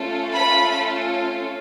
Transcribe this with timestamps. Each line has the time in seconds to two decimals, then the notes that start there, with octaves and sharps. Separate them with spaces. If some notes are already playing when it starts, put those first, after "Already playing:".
Already playing: A3 C#4 F4 A4
0.33 B5